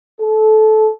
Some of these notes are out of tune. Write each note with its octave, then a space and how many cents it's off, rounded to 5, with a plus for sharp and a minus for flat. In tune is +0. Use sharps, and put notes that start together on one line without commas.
A4 -20